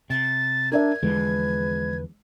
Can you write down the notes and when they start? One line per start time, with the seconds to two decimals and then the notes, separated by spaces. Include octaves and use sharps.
0.10 C3 A6
0.72 D4 A#4 D5 E5 G#6
1.03 E2 D3 F3 G#3 B4